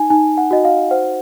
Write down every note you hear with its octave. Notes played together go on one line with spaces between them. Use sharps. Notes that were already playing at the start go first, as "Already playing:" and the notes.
Already playing: D#4 G#5
D#4 G#5
F#5
F#4 D#5
F5
C5 F#5